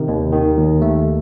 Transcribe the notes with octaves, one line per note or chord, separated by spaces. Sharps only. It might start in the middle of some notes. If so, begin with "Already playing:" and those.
Already playing: C3 D#3
D#2
D#3
D#2
A3